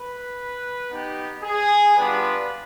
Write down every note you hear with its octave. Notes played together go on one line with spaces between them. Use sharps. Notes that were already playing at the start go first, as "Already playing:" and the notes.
Already playing: B4
B3 D#4 G4
G#4
G3 B3 D4 F4 B4